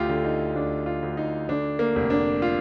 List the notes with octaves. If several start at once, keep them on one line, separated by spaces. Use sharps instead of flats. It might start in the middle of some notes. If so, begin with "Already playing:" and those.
Already playing: D2 F4 G4
D3
D#4
D2 D4
F4
D2
D#4
D3 D4
A#3
F1
D4
F4